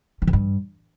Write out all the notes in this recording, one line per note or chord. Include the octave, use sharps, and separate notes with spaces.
D#3
E3
G2